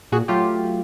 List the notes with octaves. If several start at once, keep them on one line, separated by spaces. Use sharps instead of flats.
A#2 F#4 G#4
F#3 A3 F4 G4